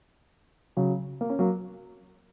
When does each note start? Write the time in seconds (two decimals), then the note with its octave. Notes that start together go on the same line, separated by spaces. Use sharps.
0.77 C#3 F#3
1.21 A#3
1.30 C#4
1.39 F#3 A#3